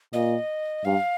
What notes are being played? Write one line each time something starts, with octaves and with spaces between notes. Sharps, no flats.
A#2 D#5
G2 F5